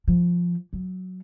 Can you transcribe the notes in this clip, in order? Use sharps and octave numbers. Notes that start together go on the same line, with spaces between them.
F3
F#3